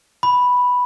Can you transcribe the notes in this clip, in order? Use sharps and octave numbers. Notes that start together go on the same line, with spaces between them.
B5